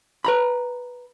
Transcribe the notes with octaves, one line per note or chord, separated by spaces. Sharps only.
B4 A#5 B5